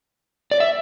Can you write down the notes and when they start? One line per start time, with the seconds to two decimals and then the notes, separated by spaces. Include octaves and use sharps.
0.51 D5
0.60 E5